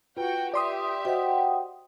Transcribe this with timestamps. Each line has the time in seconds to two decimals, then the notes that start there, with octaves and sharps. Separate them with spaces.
0.17 F4 F#4 B4 G5
0.54 G4 D5 E5 C6 D#6
1.05 F#4 C5 D#5 F#5 G5